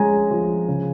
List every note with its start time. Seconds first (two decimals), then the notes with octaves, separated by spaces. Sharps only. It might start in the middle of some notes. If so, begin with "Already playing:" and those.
Already playing: F3 G#3 C#4 G#5 A#5
0.31 F3
0.68 C#3